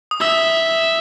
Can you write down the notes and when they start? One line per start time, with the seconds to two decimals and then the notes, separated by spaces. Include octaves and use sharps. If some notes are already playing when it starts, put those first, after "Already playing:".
0.11 D#6
0.21 E5 E6